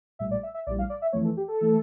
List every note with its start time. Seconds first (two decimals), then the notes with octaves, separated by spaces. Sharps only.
0.19 A#1 A2 G3 E5
0.31 D5
0.43 E5
0.54 E5
0.67 A#1 A2 G3 D5
0.79 F5
0.90 D5
1.02 E5
1.12 F2 E3 A3 C#5
1.25 A4
1.37 G4
1.48 A4
1.61 E3 A3